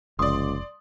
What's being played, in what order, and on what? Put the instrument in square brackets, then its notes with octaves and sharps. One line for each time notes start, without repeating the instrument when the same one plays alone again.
[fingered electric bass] F1 [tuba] C#2 [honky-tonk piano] D5 C6 [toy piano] D#6